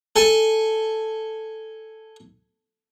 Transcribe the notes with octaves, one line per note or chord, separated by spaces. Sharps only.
A4 G#5